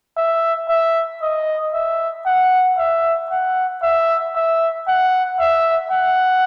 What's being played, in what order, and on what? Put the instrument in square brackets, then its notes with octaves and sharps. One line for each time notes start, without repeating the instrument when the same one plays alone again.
[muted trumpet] E5
E5
D#5
E5
F#5
E5
F#5
E5
E5
F#5
E5
F#5